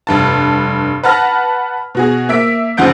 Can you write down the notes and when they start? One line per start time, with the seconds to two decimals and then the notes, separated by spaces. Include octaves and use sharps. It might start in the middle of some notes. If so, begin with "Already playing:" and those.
0.07 F1 G2 A5
1.03 B4 F#5 A5 F6 A#6
1.95 B2 F#4 G#4
2.29 A#3 E5 B6 D7
2.77 F#1 C#3 F3 F#5 G6 D7